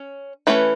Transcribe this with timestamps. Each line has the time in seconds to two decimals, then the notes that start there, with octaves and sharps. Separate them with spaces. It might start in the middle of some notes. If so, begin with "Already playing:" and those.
Already playing: C#4
0.47 E3 A3 C#4 B4